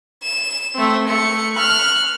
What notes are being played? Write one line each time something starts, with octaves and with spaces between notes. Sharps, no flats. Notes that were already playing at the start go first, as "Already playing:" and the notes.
E7
A3 C4
A3 C#7
F6 F#6